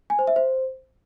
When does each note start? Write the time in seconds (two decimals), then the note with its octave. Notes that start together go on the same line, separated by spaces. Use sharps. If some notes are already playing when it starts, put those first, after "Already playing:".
0.10 G#5
0.19 C5
0.27 E5
0.36 C5